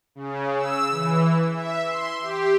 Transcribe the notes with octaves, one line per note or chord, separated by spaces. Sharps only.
C#3
E6
E3
E5
C6
G4